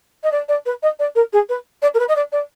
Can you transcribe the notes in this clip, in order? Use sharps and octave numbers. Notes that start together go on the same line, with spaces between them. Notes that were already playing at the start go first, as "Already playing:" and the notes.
D#5
D5
D5
B4
D#5
D5
A#4
G#4
B4
D5
A#4
B4
D#5
D5
D5